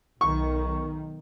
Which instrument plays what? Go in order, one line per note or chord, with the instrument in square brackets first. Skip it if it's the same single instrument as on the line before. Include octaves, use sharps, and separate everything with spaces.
[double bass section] B1 D#3 [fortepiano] C#6